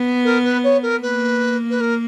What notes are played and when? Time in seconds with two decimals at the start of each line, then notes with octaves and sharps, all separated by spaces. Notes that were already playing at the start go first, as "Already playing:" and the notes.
Already playing: B3
0.24 A#4
0.44 B4
0.63 C#5
0.82 A#4
1.02 A#3 B4
1.70 B4
1.80 A#4